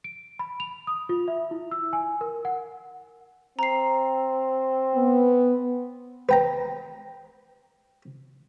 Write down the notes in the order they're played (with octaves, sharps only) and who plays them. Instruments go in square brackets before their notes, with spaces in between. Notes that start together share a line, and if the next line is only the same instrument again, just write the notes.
[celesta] D7
B5
F7
D#6
F4
E5
E4
E6
G#5
A#4
F#5
[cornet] C4 [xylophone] A#5 C7
[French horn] B3
[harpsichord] B4 G5 A#5